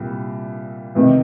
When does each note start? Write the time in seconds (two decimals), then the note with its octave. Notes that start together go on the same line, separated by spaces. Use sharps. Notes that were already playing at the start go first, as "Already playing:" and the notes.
Already playing: C2 A#2 G3
0.95 E2 C3 D#3